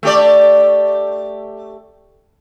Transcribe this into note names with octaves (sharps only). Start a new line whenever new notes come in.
A3 G4 D5